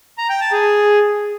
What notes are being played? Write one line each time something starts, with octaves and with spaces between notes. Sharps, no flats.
A#5
G5
A5
G#4